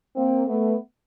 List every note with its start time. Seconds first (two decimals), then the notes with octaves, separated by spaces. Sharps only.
0.16 A#3 C4
0.47 A3 B3